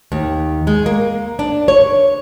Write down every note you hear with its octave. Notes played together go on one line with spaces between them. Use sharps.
D#2
G#3
A#3
D4
C#5